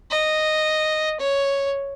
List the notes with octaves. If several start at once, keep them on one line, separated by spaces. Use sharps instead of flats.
D#5
C#5